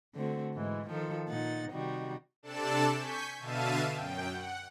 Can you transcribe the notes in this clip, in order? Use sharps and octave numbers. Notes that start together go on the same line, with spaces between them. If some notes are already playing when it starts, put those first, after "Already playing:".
D3 A3 C4 F#4
G#2 E3 G#3
D#3 F3 F4 A4
A#2 D#4 F#5 A6
C3 D#3 G3 D#4 F#4
C3 D4 A4 D5 A5 E7
G#5 C#6 G6 B6
B2 D3 E5 F5 A5 D#7
F#2 G5
F#5